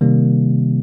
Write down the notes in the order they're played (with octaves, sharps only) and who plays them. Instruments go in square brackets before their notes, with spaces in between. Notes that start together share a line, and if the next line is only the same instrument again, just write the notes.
[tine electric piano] C3 D#3 G3 A#3